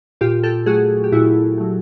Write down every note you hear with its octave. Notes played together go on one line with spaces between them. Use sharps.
A#2 F4 G4
G4 A4
F#3 A3 F#4 G#4
G4
A#2 E4 F#4
F#3 A3